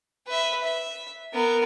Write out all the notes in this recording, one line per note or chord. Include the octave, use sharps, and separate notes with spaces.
B4 E5
E5
B3 A#4